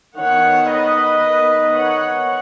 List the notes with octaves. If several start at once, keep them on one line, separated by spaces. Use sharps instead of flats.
D#3 B3 C#5 F#5
B4 D#5
D#3 B3
C#5 F#5